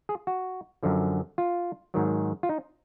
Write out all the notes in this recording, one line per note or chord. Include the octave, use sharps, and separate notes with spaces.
G#4
F#4
F#2 D3 F3
F4
G#2 D#3 F#3
F4
D#4